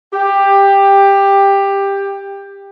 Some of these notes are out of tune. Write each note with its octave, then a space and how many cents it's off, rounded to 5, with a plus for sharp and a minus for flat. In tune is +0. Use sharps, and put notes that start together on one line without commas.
G4 +15